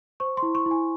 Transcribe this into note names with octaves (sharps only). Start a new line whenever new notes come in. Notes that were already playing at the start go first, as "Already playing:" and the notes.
C5 C#6
C6
E4
C#6
E4
G#5